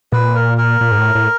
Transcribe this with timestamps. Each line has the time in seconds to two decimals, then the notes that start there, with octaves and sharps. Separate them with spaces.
0.12 A#2 B4
0.35 A#4
0.58 A#4
0.81 A#2
0.91 G#2
0.98 A2
1.15 A2